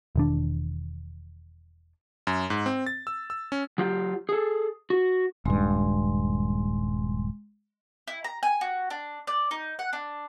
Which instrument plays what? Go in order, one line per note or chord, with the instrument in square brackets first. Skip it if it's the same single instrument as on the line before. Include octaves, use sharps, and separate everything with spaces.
[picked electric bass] E1 D#3 D4
[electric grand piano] F#2
G#2
C4
A6
E6
E6
C#4
[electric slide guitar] F#3 F4 G4
G#4 A4
F#4
[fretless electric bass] D#1 G2 [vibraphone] G#3 C6
[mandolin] E4
A#5
G#5
F#4
D4
D5
D#4
F#5
D4